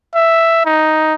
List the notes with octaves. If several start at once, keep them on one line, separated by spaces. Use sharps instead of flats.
E5
D#4